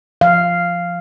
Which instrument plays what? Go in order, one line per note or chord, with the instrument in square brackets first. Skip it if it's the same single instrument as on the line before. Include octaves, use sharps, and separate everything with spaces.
[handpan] F3 F5